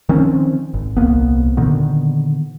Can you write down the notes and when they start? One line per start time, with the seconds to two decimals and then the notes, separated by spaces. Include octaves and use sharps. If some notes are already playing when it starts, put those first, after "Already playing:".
0.09 D#3 F3 C4 C#4
0.74 G#1
0.97 D#1 C2 A#3 B3
1.57 A#2 D3 D#3 B3